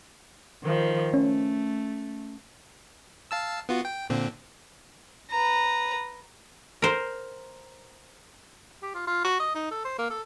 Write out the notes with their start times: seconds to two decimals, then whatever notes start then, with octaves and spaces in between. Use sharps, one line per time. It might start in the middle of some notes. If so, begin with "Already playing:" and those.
0.63 D#3 F3
1.14 A3 C#4
3.31 F5 A5 E6
3.69 B3 F4 F#4
3.85 G5
4.10 A#2 D3 C4
5.31 B4 A#5
6.82 A#4 C5
8.82 G4
8.95 F4
9.07 F4
9.24 F#4
9.40 D#5
9.55 D#4
9.71 A4
9.85 C5
9.99 A#3
10.10 A4